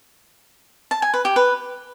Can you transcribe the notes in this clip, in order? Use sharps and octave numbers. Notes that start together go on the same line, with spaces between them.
A5
G#5
B4
G4
B4